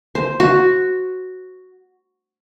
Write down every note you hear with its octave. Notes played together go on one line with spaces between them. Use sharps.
C5
F#4